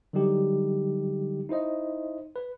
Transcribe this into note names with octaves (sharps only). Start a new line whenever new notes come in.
D3 F#3 G3 D#4 G4
D#4 E4 C5 D#5
B4